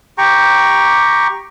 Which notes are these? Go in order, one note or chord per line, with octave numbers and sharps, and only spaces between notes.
G4 G5 A#5 C#6